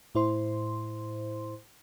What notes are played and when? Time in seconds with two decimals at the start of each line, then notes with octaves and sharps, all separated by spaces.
0.15 A2 E4 C5 C6